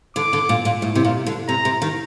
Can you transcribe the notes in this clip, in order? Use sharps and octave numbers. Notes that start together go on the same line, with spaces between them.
D3 D6
D3
A#2
A#2
A2
C3
A#2
D3
C3 A#5
C3
D#3